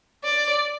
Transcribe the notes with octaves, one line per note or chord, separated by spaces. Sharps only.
D5